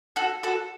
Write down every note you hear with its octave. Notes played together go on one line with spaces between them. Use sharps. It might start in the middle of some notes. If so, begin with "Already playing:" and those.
F#4 A4
F#4 A4